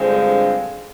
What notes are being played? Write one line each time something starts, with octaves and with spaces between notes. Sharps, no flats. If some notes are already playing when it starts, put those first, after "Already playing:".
Already playing: G2 D3 F3 G#3 C4